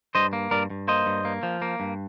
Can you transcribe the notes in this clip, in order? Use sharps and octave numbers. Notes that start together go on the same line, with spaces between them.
G2 C5 D#5
A#3
G2 A#4 D5
G2
A#3 C5 D#5
G2
A#3
F3
A#3
G2